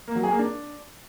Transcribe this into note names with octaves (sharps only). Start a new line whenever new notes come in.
A#3
F#3
G#4
A#3
D4